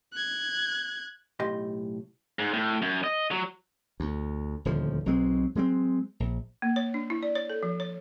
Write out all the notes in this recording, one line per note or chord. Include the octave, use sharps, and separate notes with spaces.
F#6 G#6
B1 A2 G4 D#5 C6
G#2
A2
F#2
D#5
F#3
D2
D#1 D2 D3 F3
B1 F#3 G#3 C4
F#3 G#3 A#3 C4
A#1
A#3
C#5
D4
E4
D5
C#5
A4
F3
C#5